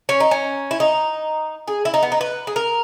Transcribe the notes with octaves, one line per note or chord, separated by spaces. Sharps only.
C#4
D#4
C#4
E4
D#4
G#4
E4
D#4
B3
D#4
B4
G#4
A#4